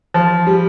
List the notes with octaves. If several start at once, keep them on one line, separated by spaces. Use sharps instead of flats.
F3
G3